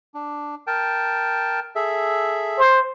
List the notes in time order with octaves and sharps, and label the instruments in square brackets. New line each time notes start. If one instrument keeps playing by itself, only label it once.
[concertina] D4
A#4 G5 A5
G#4 A4 E5
[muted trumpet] C5